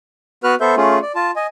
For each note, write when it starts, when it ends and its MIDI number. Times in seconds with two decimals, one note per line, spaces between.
0.44 0.55 59
0.44 0.55 66
0.44 0.55 71
0.44 0.55 89
0.44 0.55 90
0.61 0.75 59
0.61 0.75 69
0.61 0.75 72
0.61 0.75 76
0.61 0.75 91
0.77 0.99 57
0.77 0.99 61
0.77 0.99 65
0.77 0.99 68
1.02 1.12 74
1.15 1.31 65
1.15 1.31 81
1.36 1.47 75
1.36 1.47 80